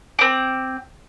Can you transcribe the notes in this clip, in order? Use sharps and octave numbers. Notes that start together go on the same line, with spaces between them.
C4 D6